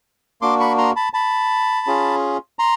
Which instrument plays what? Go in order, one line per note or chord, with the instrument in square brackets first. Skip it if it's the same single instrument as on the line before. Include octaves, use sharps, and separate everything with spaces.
[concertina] A#3 D4 F#4 C6 D6
B5 C#6
A#5 C6
A5 B5
A5 B5
C#4 F4 G#4
A#5 C6